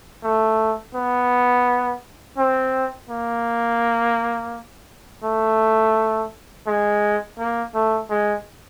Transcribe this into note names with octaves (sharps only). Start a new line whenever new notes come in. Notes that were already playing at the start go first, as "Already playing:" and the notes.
A3
B3
C4
A#3
A3
G#3
A#3
A3
G#3